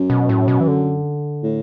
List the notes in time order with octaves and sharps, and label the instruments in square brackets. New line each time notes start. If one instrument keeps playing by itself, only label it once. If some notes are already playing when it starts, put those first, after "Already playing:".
Already playing: [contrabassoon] F#2
[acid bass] B2
A2
B2
E3
D3
[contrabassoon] A2